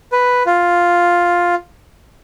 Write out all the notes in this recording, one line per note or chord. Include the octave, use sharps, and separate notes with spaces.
B4
F4